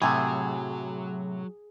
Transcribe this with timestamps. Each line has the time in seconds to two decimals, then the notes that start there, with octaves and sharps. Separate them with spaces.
0.02 A2 C3 F#3 A3 F#4 G#4